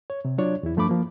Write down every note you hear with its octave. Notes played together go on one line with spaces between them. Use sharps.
C#5
C3
F#3 D4 F4 C#5 D5
E2 E4
G2 F3 A3 D4 B5 D6
F3 A#3